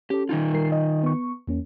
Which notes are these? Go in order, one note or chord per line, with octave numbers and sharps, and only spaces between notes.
C#4 G4 A4
D#3 D#4 F4
G3 A#4 C7
D#5
B3 C#6
E2 A#3 C#4